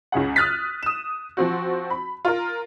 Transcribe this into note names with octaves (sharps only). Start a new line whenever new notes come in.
C#2 C#3 G#4 F#5
D#6 F6 F#6 A6 B6
D#6 E7
F3 C4 F#4
B5
F4 A#4